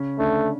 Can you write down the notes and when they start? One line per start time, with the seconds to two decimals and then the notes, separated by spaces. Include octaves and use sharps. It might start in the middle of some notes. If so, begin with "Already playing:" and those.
Already playing: C#3 C#4
0.19 D3 A3 D4